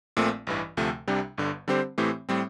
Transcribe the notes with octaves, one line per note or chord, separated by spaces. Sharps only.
A#1 A#2 A3 C4
A1 G2 E3
D2 C3 F3 A3
C2 C3 G3 D4 G4
G1 G2 D3
D3 G3 C4 G4 C5
A2 E3 A3 C4 G4
A2 G3 C4